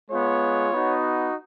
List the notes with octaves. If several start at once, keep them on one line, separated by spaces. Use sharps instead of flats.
G#3 B3 F4 C#5
B3 D#4 F#4